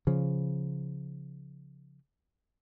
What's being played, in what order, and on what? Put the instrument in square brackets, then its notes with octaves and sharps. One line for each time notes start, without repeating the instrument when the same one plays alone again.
[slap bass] C#3 F3